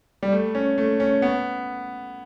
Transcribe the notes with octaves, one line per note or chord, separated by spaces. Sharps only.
G3
A3
C#4
A3
C#4
B3